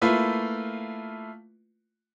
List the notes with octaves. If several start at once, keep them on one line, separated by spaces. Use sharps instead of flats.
A3 A#3 E4 F4 B4